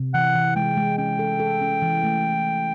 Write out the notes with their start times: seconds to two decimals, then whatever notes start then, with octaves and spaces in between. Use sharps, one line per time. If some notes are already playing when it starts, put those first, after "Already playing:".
Already playing: C3
0.14 E3 F#5
0.35 E3
0.56 G#3 G5
0.77 G#3
0.98 C#4 G5
1.19 A4
1.40 A4
1.61 C#4
1.82 E3
2.03 A3